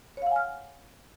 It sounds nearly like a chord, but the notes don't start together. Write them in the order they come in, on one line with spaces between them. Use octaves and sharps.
C#5 F5 F#5 G#5 F6